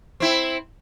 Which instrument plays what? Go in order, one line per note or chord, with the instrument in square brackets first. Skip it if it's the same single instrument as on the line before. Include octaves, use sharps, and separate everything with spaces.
[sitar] C4 E4